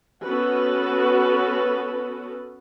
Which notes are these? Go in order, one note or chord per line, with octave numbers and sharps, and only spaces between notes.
B3 C#4 F#4 A4 B4